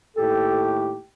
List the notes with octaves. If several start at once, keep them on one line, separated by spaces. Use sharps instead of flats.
D#2 A2 G4 A4